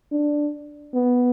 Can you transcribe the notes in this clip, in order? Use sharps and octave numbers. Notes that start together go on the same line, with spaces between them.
D4
B3